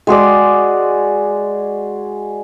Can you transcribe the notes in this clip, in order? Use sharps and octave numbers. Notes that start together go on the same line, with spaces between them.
G#3 F#4 G#4 D5